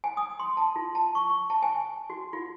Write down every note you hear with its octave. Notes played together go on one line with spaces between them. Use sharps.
G#5
D#6
C6
A5
F4
A5
C#6
C#6
A5
G#5
F#4
F4